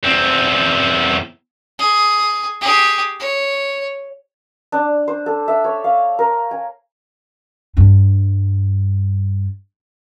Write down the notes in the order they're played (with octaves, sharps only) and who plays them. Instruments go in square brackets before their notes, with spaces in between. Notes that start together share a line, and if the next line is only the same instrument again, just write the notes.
[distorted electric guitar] E2 C4
[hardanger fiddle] G#4
G4 G#4
C#5
[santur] D4
C5
A4
E5
C#5
F5
A#4
G#5
[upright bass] G2 D4